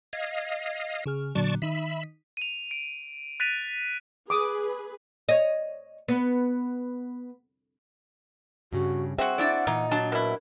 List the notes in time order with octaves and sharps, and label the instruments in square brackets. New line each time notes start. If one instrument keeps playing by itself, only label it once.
[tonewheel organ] D#5 F5 [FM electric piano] G#6
[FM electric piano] C#3 G#4 F6
[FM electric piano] A#2 D3 F#3 [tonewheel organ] D5 A5 C#6
[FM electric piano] D#3 D#4 B6 [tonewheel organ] E5 B5
[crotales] D#7 F7
D7
F#6 A6 B6 D7 D#7 F7
[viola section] G#4 B4 [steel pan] D6 D#6
[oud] C#5 D#5
B3
[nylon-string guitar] G2 C#3 [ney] F#4
[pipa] C4 F#4 [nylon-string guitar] G#4 E5 [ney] F#5
[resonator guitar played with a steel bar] D4 E4 D5
[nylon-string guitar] A#2 [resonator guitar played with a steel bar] E3 [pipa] D#4
[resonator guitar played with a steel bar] F#3 D4 A5
[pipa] B2 E4 [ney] A#4